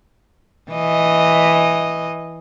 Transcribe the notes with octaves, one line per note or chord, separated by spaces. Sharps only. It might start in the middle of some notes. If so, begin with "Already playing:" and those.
E3 D#5